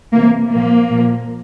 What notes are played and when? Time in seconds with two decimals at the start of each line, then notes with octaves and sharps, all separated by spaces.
0.13 C3 E3 A#3
0.52 A#2 F3 A#3
0.90 A#2 F3